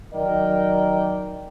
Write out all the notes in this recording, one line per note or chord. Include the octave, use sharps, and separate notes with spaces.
D#3 F#3 A#4 D5 D#5 G5